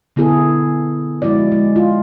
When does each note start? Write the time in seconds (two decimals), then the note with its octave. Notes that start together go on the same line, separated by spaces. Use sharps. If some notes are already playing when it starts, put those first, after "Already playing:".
0.16 D3 B3 E4 G#4 A4
1.22 F3 G#3 E4 F#4 D5
1.52 G#3
1.76 F4